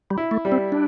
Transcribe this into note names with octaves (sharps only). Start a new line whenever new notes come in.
G3
E4
A3
G3
C4
D4